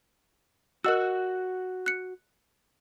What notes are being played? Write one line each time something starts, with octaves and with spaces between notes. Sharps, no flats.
F#4 A#4 D#5 F#5 E6
F#6 C#7